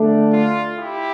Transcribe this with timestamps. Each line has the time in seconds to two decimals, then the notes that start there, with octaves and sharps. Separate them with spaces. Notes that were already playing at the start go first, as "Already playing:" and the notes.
Already playing: D3 A3 D4
0.32 F4
0.76 E4 G4